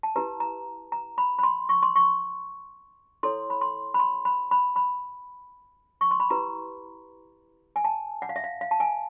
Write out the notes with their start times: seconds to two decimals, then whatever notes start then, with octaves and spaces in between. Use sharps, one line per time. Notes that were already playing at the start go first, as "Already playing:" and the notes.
0.03 A5
0.16 E4 G4 B4 A#5
0.40 A#5
0.92 A#5
1.18 B5
1.39 B5
1.43 C6
1.69 C#6
1.83 C6
1.96 C#6
3.23 E4 A4 C#5 C6
3.50 B5
3.61 C6
3.94 B5
3.99 C6
4.25 B5
4.51 B5
4.76 B5
6.01 C#6
6.11 C6
6.20 B5
6.30 E4 G4 B4 A#5
7.76 G#5
7.84 A5
8.22 F#5
8.29 F5
8.36 E5
8.44 F5
8.61 F5
8.71 A5
8.80 G#5